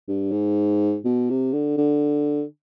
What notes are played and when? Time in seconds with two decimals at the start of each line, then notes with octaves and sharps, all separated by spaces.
0.08 G2
0.32 G#2
1.05 B2
1.30 C3
1.53 D3
1.78 D3